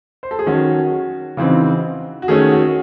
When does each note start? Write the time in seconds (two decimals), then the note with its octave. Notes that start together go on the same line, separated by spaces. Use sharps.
0.23 C5
0.31 A4
0.39 G#4
0.46 D#3 F#3 C#4 F#4
1.37 C#3 E3 C4 D#4
2.22 F#4
2.28 D#3 A3 C#4 G#4
2.51 F#4